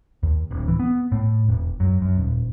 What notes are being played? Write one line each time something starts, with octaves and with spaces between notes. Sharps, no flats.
D#2
D1
E3
B3
A2
E1
F#2
F#2
D#1